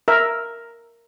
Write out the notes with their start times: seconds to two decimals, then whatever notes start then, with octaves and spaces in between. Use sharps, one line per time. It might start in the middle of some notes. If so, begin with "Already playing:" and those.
0.08 A#4 E5